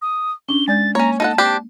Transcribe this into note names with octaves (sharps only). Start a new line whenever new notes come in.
D#6
C#4 D4 G7
G#3 D5 G6 A6
A#3 C#4 C#5 A#5
D#4 A4 F#5 A5
C4 D4 G4